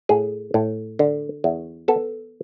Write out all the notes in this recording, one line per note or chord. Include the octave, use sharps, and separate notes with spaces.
A2 G#4
A2
D3
E2
B3 A4